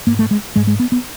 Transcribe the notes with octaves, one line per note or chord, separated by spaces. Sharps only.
G#2 A#3
A3
G#3
G#2 G#3
G#3
B3
B3